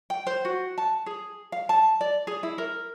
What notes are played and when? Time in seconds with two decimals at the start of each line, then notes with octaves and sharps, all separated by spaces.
0.10 G5
0.27 C5
0.45 F#4
0.78 A5
1.06 G#4
1.52 F5
1.69 A5
2.01 D5
2.27 G#4
2.43 E4
2.58 A#4